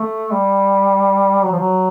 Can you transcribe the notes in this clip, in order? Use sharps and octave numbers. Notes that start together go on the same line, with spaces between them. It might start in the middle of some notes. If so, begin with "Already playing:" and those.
Already playing: A3
G3
F#3
F3
F#3